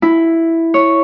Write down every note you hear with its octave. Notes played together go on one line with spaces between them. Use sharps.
E4
C#5